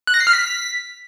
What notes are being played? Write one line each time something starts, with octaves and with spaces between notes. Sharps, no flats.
F#6
A#6
C7
F6
B6